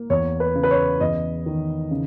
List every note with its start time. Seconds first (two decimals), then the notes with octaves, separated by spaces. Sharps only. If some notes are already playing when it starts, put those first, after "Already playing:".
Already playing: A#3
0.10 E2 C#5
0.40 B4
0.55 C#3
0.63 B4
0.71 C#5
1.01 E2 D#5
1.46 D#3
1.91 C#3